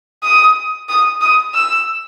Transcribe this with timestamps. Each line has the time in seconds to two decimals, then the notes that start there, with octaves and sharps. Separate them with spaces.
0.23 D#6
0.89 D#6
1.21 D#6
1.54 E6